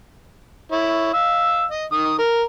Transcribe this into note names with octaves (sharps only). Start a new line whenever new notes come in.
E4 C#5
F5 E6
D#5
D#3 D#6
A#4